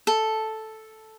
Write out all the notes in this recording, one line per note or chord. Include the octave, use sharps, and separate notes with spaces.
A4